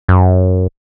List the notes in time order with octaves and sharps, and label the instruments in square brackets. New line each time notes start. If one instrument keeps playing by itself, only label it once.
[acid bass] F#2